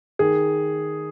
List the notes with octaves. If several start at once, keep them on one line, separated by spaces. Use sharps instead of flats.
D#3 G#4